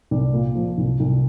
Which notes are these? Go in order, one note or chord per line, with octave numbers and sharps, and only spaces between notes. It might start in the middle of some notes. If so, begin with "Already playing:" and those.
C2 D5
A#2
F3
C2
C2